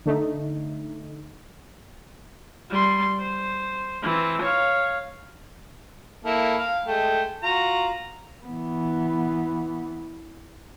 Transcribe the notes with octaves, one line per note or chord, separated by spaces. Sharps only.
D3 A3 D#4
G3 C6
C5
E3 C4
C#5 F5
A#3 E4 A4
F5
G#3 A3 G5
F4 F#4 A#5
E3 B3